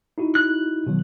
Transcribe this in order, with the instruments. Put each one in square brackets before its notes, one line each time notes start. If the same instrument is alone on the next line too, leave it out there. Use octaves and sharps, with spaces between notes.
[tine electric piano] D#4 E4 F#4
[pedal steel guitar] F#6
[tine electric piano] B2 D#3 F#3